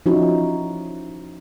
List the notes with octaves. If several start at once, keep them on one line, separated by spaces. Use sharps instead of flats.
F3 C#4 D#4 E4 F#4